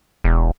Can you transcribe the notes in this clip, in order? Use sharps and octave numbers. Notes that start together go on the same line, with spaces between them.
E1